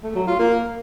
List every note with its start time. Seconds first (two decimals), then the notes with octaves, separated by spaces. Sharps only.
0.03 A3
0.15 F#3
0.27 F4
0.39 A#3